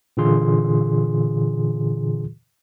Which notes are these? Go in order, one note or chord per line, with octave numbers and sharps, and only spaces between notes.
A#2 D3 E3 F4 G#4 C6